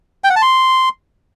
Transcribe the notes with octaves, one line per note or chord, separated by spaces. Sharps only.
G5
F#5
A5
C6